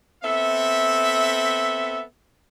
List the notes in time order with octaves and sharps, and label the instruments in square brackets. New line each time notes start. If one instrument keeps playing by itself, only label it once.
[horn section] B3 C4 A4 E5